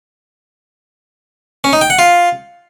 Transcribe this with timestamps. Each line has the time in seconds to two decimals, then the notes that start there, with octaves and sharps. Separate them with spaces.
1.64 C#4
1.73 D#4
1.81 G5
1.90 F#5
1.99 F4